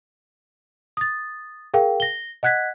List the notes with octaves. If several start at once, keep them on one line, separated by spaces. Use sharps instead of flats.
D#6 A6
G#4 A#4 F5 G5
A#6 G7
D#5 F#5 F#6 G#6 B6